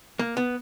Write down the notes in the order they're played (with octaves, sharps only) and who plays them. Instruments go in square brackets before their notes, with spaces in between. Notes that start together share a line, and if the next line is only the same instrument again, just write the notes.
[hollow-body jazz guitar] A#3
B3